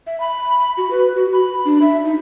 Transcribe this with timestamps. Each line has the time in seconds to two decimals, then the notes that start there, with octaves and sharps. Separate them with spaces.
0.07 E5
0.20 B5
0.77 F#4
0.91 B4
1.15 F#4
1.33 B5
1.65 D4
1.82 E5
2.05 D#4